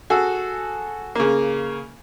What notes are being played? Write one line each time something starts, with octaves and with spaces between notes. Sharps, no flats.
F#4 G#4 A4
C#3 A#3